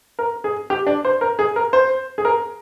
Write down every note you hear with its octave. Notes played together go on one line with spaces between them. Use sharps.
A#4
G#4
G4
D4
C5
A#4
G#4
A#4
C5
G#4
A#4